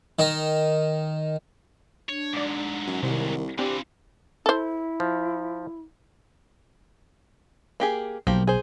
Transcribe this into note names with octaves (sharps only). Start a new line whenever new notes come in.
D#3 D#4
D4 C#5
G#2 F#3 D5 D6
F#2
C2 C3 D#3
E3 C4 D4 F4 G4
E4 A4 C5
F3
A#3 G4 G#4
B1 F3 A#3 G4
G#4 C5